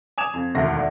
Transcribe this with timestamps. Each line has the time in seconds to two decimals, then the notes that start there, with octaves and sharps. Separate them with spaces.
0.18 G#5 D6 D#6 G#6 E7 F7
0.33 F2
0.55 E1 D2 D#3 E5 A#6
0.76 D5 E5 F#5